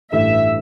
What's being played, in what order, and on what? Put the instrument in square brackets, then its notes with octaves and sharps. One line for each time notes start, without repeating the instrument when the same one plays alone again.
[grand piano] A1 G2 E3 A3 E4 [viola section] E5